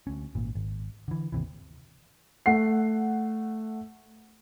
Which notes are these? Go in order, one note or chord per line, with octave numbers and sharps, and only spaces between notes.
D2 C#4
G#1 A#2
G#1
D3 E3
G#1 D#2 C3 E3
A3 F#5 C7